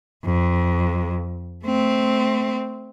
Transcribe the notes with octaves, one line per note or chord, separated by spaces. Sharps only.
F2
A3 C4